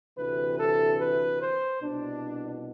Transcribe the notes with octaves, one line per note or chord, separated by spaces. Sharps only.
D2 C3 E3 B4
A4
B4
C5
C2 B2 D4